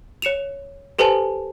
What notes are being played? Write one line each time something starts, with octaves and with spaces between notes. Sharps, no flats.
C#5 C#7 E7 F7
G4 A4 B4 C5 G#5 A5